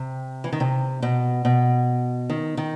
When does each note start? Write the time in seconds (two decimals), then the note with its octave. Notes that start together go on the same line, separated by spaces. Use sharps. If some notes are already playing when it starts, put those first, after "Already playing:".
Already playing: C3
0.44 E3
0.52 D#3
0.60 C3
1.02 B2
1.45 B2
2.30 D#3
2.57 D#3